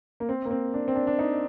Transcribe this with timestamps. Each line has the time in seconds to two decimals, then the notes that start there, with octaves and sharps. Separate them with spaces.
0.20 A#3
0.29 C4
0.45 A#3
0.51 C4
0.74 D4
0.88 C4
0.96 D4
1.07 D4
1.19 D#4